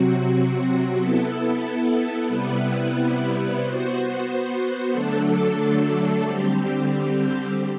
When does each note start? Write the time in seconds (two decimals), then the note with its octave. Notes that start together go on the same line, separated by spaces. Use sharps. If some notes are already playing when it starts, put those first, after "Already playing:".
Already playing: C3 F#3 C4 F#4
0.97 B3 E4 A4
2.28 C3 G3 B3 E4 B4
3.60 B3 F#4 C5
4.90 D3 F#3 A3 D4 A4
6.22 D3 G3 C4 G4